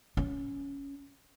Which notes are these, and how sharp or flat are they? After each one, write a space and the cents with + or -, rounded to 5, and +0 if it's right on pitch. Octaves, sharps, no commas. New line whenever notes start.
C#4 +10